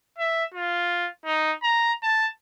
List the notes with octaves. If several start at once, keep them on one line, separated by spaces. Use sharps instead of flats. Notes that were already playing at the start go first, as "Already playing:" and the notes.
E5
F4
D#4
A#5
A5